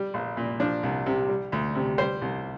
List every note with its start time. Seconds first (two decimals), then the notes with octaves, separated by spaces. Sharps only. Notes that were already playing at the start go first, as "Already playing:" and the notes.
Already playing: G3
0.14 A#1
0.37 A#2
0.60 F3 D4
0.83 C2
1.06 C3
1.29 G3
1.52 D2
1.75 C3
1.98 G3 C5
2.22 C2